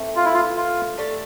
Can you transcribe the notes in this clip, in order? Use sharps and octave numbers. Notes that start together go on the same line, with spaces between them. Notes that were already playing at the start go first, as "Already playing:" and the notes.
Already playing: E3 A3 C4
F4
E4
F4
F4
A3 D4 G4 D5